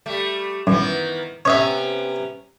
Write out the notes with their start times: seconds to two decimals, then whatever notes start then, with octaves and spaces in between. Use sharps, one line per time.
0.06 G3 A3
0.67 F#2 D#3 E3 B3
1.45 C3 B3 C#4 C#5 D#5 E5